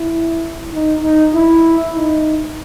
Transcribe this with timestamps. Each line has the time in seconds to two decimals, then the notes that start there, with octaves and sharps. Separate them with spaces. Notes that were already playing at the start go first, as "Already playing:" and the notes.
Already playing: E4
0.74 D#4
1.03 D#4
1.34 E4
1.94 D#4